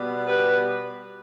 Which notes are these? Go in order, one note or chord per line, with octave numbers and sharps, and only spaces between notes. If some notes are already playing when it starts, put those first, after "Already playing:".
Already playing: B2 G3 B3
G4 B4